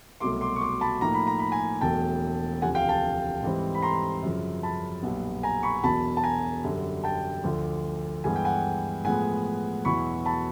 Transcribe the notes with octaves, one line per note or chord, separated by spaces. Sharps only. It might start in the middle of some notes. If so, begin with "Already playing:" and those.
C2 B2 F#3 A3 C6 D6
C6 D6
C#6
C6 D6
A5 B5
A2 F3 A#3 D#4 A#5
B5
A#5
B5
G#5 A#5
E1 E2 B2 F#3 A3 G5 A5
E1 D2 C3 F3 F#5 G#5
F5 G5
G5 A5
G#2 E3 G3 C4
B5
A#5 C6
F#2 C#3 F3
A5 B5
B1 A#2 G3 B3
G#5 A#5
B5 C#6
E1 E2 B2 F#3 A5 B5
A5
G#5 A#5
F#2 D3 G3
G5 A5
D2 D3 F3
G2 E3 G#3 B3 G#5
G5
F#5 G#5
A2 F3 G#3 B3 F#5 G#5
E2 B2 F#3 B3 E4 B5 C#6
A5 B5